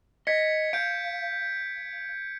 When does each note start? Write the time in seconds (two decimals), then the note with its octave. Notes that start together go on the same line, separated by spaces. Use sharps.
0.27 D#5 G#6 B6 C#7
0.73 F5 G6 D7